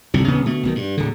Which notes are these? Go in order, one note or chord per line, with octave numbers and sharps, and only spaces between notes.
G1 C2 C3
D1 C#3 B3
B2 D3 A3
B1 B2 D#3
G2
D1 D3